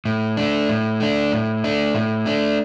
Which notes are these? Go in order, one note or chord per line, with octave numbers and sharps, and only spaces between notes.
A2
A3 D4
A2
A3 D4
A2
A3 D4
A2
A3 D4